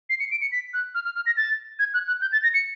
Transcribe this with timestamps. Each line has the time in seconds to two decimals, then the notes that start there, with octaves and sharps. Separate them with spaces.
0.10 C7
0.20 C#7
0.31 D7
0.41 C#7
0.52 B6
0.73 F#6
0.95 F6
1.05 F6
1.16 F6
1.26 A#6
1.37 A6
1.79 G#6
1.94 F#6
2.07 F#6
2.21 G6
2.32 A6
2.43 A#6
2.54 C#7